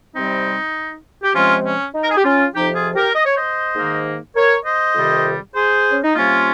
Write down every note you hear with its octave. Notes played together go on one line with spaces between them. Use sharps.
C3 G3 C4 D#4
G4
C3 F3 G#3 C4 C#4 F4
C#4
D#4
A#4
G#4
G4
C#4 F4
F2 C3 F3 D#4 G4
F4 G#4
G4 A#4
D#5
C#5
C5 D#5
G#2 D#3 A#3
A#4 C#5
C5 D#5
F2 C3 D#3 G3
G#4 C5
C#4
D#4
C3 G3 A#3 C#4 F4